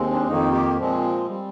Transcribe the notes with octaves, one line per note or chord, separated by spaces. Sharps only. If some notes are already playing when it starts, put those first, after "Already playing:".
Already playing: D#2 G#3 C4
D4
F2 D#3 A#3 D#4
G4
A#2 F3 G#3 C4
G3 C4